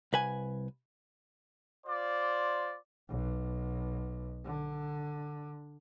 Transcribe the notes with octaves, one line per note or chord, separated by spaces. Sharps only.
C2 B4 G#5
F4 C5 D5
B1
D3